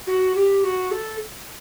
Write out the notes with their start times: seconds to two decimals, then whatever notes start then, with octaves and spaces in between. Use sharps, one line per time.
0.07 F#4
0.35 G4
0.64 F#4
0.91 A4